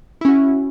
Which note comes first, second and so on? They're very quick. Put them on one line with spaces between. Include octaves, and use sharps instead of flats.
E4 C#4 F#4